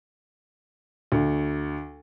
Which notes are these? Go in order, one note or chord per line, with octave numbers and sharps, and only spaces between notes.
D2